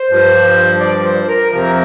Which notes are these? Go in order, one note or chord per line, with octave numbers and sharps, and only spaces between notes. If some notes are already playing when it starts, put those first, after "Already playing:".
Already playing: C5
G2 F3
D5
C5
A#4
F2 C3 F3 A#4